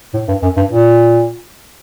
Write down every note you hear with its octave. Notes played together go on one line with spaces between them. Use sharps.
A2
G2
F#2
G2
A#2